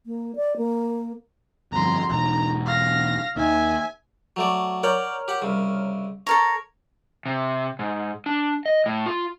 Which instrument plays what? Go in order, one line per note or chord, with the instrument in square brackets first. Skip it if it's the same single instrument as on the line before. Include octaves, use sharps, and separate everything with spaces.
[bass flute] A#3
D5
A#3
[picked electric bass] G1 F2 [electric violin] A#5 C6
[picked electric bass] E1 G#2 [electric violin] A#5
[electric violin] F5 A#6
[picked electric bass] D#2 D#3 [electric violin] E5 G#5
[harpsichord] F#3 A3 D5
[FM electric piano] A#4 C#5 F6 [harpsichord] D5 F#5 G5
[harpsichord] G4 F#5
C2 C#3
[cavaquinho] A4 A#4 A#5 [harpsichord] C#5
[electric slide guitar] C3
G#2
D4
D#5
A2
F4